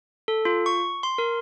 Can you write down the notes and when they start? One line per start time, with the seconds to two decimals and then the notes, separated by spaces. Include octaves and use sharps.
0.28 A4
0.45 F4
0.66 C#6
1.03 C6
1.18 A#4